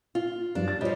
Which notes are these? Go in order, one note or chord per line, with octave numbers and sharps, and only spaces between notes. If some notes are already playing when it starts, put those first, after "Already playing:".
F4
G2 F3 F#3 D4
A6
F3 G3 F4 C#5 D#5